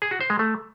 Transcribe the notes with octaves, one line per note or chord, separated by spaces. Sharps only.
G#4
F#4
C5
G#3
A3